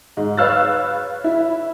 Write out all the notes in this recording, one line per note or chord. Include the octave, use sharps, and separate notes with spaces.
G#2
B4 C#5 F5 E6 F#6 A6
E4